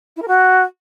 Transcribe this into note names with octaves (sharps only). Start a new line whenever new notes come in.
E4
A#4
F#4